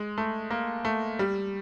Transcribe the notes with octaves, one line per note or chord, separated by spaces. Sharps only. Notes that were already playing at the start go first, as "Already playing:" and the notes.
Already playing: G#3
A3
A#3
A3
G3